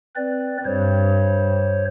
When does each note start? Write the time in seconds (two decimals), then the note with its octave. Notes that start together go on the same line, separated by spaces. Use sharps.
0.16 C4 B4 D5
0.65 G2 C5 C#5